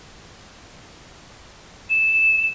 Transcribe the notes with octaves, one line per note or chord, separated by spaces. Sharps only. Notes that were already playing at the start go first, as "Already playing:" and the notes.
E7